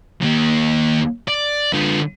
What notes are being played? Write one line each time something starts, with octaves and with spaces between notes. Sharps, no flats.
D#2 A#3
D5
D3 F4